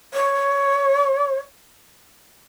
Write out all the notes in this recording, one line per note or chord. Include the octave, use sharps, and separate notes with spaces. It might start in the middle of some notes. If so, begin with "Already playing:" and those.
C#5